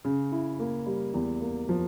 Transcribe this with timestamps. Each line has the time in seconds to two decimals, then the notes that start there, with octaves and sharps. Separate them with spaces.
0.04 C#3
0.32 E4
0.59 A#3
0.86 G3
1.14 E2
1.41 A#3
1.69 F3